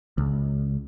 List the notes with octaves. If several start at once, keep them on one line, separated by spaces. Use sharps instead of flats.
C#2